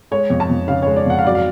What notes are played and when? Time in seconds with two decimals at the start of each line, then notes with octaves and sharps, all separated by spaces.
0.11 G#3 C#5
0.30 F2
0.40 A5
0.50 F2
0.68 C#3 F5
0.82 G#3 C#5
0.96 D5
1.06 F2 F#5
1.19 F5
1.25 F#3 D5
1.35 F5